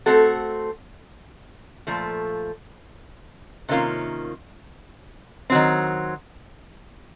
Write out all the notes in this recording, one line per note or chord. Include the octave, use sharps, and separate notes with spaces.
A3 C4 F#4 A4
A#2 F3 A3
C3 D#3 A#3 C#4 F4
D#3 F#3 C4